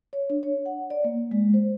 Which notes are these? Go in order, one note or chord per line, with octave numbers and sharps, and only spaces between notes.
C#5
D4
C#5
F#5
D5
A#3
G#3
C5